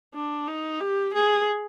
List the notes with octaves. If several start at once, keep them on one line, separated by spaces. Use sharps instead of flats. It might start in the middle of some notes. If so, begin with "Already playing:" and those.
D4
D#4
G4
G#4